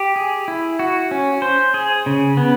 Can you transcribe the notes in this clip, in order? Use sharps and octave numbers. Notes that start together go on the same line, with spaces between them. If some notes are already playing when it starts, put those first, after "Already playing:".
Already playing: G4
G#4
E4
F#4
C#4
C5
G#4
C#3
B3